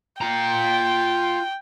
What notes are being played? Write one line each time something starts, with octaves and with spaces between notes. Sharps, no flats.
F4 G5 A#5